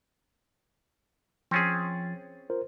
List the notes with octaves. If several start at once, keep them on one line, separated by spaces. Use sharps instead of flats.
F3 C4 C#4 G#4 A6
F4 A#4 C5